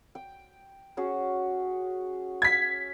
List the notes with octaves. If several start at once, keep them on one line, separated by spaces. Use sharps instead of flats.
G5
C#4 F#4 G#4
G#6 B6